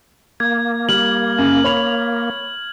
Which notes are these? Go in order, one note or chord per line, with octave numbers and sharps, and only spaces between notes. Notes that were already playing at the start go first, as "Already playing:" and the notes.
A#3 G#6
G3 F6 F#7
F#2 C#3
C#5 B5 F7